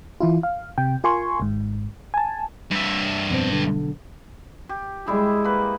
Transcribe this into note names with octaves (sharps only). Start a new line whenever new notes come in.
E3 E4 F4
F5
C3 G5
F4 A#4 G#5 C6 C#6
G#1 G#2
G#5 A5
G2 E5
F2 B2 C4
B1 D3
G4
G3 G#3 E4 G#4
A#3 B4